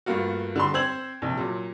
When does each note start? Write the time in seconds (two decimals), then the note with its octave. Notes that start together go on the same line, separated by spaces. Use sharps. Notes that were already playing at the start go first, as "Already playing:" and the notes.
0.06 G2 A3 A#3 F4 F#4
0.56 D3 G3 C6
0.74 C4 C5 E6 G#6 F#7
1.22 A#1 C3
1.37 A#2 F#3